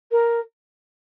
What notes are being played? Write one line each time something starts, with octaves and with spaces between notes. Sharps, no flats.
A#4